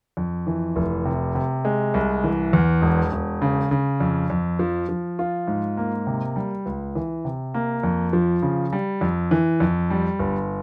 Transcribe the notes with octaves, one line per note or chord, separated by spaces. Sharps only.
F2
E3
F1
C3
C3
G#3
C2
E3
E2
E1
E1
C#3
C#3
F2
F2
F3
F3
F4
G#2
A#3
C3
G3
C#2
E3
C3
A#3
F2
F3
C#3
G3
F2
E3
F2
G3
G1